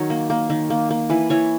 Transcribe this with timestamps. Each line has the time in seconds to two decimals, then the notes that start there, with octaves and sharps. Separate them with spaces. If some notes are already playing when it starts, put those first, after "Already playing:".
Already playing: D#3 F#3 C#5
0.10 A#3
0.30 A#3
0.50 D#3
0.70 A#3
0.90 A#3
1.10 E3 B4
1.30 E3 C#5